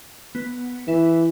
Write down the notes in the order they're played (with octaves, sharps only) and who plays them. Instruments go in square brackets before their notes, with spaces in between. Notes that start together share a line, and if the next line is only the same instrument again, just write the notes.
[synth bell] B3
[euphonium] E3 [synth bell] E4